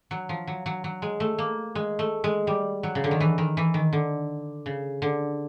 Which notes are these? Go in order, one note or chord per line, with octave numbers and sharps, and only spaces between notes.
F#3
F3
F#3
F#3
F#3
G#3
A3
A#3
G#3
A3
G#3
G3
F#3
C#3
D3
D#3
E3
D#3
E3
D#3
D3
C#3
D3